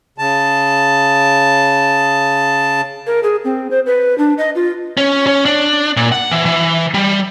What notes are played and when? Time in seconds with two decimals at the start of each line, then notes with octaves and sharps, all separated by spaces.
0.18 C#3 A5
3.07 A#4
3.23 G#4
3.44 C4
3.71 C5
3.86 B4
4.18 D4
4.38 D#5
4.55 F4
4.97 C#4
5.27 C#4
5.45 D4
5.97 A#2
6.12 F#5
6.31 E3
6.46 E3
6.94 G3